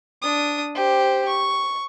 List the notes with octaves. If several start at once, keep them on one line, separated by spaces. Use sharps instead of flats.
D4 D#6
G4 C5
C#6